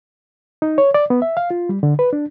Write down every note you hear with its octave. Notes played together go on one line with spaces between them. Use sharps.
D#4
C#5
D5
B3
E5
F5
F4
G3
D3
B4
D4